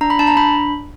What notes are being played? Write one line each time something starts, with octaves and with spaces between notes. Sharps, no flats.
D4 A#5
B5
D4 A5
A#5
D4 B5